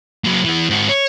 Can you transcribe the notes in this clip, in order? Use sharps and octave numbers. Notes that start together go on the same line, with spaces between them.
F#3 A#3
E3 B3
G#2 F#4
C#5